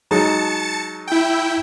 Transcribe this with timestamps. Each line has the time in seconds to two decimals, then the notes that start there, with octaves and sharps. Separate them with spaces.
0.11 F#3 G#3 D#4 A5 A6 C#7
1.07 E4 G5